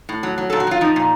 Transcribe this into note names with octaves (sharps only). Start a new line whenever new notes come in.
A2
F#3
F#3
A#2 A4
F#4
F#3 F4
F3 D#4
A#2